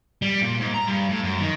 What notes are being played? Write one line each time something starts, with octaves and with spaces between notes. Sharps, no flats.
G3
A#2
G#2
A#5
G2
A2
F#2
D#3